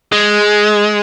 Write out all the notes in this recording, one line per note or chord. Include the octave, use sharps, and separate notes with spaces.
G#3